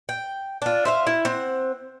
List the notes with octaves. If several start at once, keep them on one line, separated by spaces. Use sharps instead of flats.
G5
D4 F4
C5 E5 F5
E4
C4 F#5